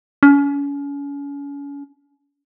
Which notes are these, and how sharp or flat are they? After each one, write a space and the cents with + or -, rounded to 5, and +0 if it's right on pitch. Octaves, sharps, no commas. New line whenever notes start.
C#4 +35